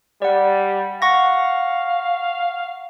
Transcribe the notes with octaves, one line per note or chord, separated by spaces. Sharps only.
G3 D5 F#5
F5 F#5 C#6 A#6